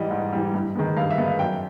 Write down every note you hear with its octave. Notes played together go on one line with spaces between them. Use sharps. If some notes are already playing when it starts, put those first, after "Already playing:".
Already playing: G#2 E3 G3 D5 D#5
G#2
E3 G3
G2
D#3 G#3 B3
G2 F5
E5
D#3 G#3 B3
F5
F#2 G5